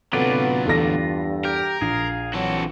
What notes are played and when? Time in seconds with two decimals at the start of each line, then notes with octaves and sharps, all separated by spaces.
0.13 D2 C3 F#3 B3 F4 A4 B4 D5
0.66 E2 G2 A4 A#6
1.45 G4 A#4
1.81 A#1 G#4 F5
2.34 E3 F#3 C4 F#4 A4